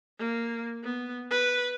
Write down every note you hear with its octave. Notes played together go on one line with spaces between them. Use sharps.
A#3
B3
B4